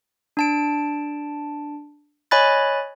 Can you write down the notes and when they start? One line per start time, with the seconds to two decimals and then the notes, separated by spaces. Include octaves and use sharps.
0.37 D4 A5 D7
2.31 C#5 D#5 G#5 B5 F#6 A6